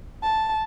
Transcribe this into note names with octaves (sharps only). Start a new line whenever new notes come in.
A5